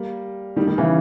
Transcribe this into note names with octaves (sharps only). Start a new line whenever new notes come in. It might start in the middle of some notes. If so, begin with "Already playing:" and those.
Already playing: G3 A#3
D#3 G3
D#3 G3
C#3 E3